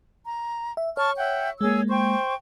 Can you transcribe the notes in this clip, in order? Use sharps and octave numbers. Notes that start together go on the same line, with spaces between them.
A#5
E5
C#5 A5 C#6 F6
E5 F#5 G5
G#3 A#3 G#4 C#5 E6
C5 G5 C#6